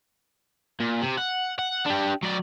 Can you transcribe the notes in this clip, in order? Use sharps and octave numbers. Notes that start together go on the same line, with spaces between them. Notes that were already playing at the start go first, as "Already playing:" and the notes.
A#2
C3
F#5
F#5
D4 G4
F#3 D5